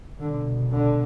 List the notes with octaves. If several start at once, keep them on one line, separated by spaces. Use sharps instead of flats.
C2 B2 D3
D3